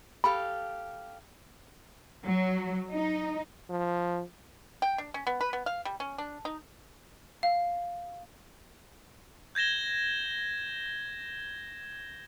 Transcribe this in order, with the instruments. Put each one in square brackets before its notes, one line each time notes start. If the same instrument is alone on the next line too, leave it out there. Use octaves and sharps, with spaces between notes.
[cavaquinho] G4 A4 F5 [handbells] B5
[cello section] F#3
D#4
[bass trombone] F3
[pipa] G5
D4
C#4
B3
B4
B3
F5
G3
C#4
D4
D#4
[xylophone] F5
[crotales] G6 G#6 A#6 E7 G7